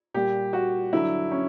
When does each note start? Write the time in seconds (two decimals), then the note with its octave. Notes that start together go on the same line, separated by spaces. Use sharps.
0.14 A#2 G3 G4
0.53 F#4
0.93 G2 D3 F#3 E4
1.31 C#4